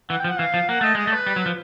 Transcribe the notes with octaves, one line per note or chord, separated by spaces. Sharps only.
E3 F#5
G5
F3
F#5
E3 F5
F3
A#3 F#5
A3 D#5
G#3 D#5
A3
B4
G3
F#3
F3